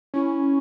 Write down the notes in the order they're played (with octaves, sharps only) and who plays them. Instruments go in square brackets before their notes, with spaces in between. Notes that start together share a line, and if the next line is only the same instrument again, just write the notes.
[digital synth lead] C#4 [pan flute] E4